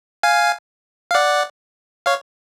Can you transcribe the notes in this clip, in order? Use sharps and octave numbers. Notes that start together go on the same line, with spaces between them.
F5 G#5
F5
D5 F#5
C#5 F5